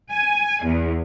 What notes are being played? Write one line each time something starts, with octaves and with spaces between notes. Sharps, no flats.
G#5
E2